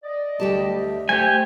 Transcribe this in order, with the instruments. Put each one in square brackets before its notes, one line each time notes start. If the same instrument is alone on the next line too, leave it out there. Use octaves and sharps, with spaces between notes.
[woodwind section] D5 D#5
[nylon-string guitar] D2 G4 A5 [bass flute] G3
[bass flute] E5
[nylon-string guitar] A3 [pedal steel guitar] G4 G#5 [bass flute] C5